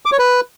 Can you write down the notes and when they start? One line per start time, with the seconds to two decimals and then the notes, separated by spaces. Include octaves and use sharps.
0.05 D6
0.12 C#5
0.19 B4